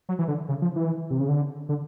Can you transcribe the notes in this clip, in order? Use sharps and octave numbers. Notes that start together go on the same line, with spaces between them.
F#3
E3
D3
C#3
F3
E3
C3
C#3
D3
D3